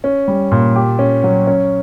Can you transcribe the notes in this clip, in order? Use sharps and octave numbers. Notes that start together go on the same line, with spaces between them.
C#4
G3
A#2
G4
C#4
F#3
C#4